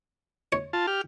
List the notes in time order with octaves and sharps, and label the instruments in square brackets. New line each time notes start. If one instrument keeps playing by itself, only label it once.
[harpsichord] C#5
[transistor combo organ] F4 A5
G4 F6